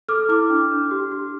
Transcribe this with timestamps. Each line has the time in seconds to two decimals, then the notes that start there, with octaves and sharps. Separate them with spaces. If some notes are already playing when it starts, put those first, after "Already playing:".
0.09 A4 D6 F6
0.29 E4 D6 F6
0.50 D4
0.71 D4
0.91 G4
1.12 G4